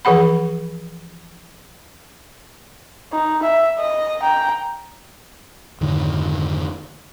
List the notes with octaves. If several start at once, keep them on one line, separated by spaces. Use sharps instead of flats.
E3 F3 G#4 F#5 B5
D#4
E5
D#5
G5 A#5
F2 G#2 D3 D#3